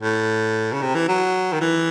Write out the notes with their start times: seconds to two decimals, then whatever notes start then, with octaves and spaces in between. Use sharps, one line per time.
0.02 A2
0.72 C#3
0.82 C3
0.95 E3
1.08 F#3
1.53 D#3
1.61 E3